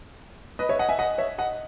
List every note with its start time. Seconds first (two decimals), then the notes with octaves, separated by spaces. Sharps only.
0.59 B4 D#5
0.69 C#5 E5
0.79 D#5 F#5
0.89 E5 G#5
0.99 D#5 F#5
1.18 C#5 E5
1.38 D#5 F#5